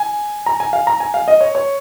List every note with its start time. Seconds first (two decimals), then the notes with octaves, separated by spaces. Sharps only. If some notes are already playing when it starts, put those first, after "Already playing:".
Already playing: G#5
0.46 A#5
0.60 G#5
0.73 F5
0.87 A#5
1.00 G#5
1.14 F5
1.28 D#5
1.41 C#5
1.55 C#5